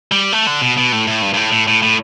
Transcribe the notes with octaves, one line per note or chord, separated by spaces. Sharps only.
G3
A3
D3
B2
B2
A2
A2
G2
G2
A2
A2
A2
A2